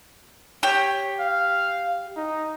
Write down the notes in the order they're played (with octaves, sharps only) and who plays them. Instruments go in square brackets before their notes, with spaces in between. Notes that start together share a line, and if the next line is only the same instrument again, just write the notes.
[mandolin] G4 [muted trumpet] C#5
[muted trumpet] F5
D#4